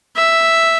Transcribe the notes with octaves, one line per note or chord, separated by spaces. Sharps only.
E5